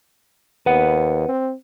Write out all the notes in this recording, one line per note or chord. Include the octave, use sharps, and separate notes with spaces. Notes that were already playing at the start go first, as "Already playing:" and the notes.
D#2 B4 F#5
C4